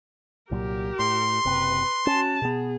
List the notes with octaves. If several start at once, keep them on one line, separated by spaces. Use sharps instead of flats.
C2 A#2 F#3 G4 A#4
A2 C6
F#1 C3 B4
C#4 F#4 A5
B2 B3 G#4